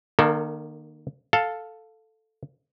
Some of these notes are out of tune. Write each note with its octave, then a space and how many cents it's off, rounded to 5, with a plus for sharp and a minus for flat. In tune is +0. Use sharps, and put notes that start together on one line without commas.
D#3 -35 A#3 +0 A4 +0
A4 +0 F5 +10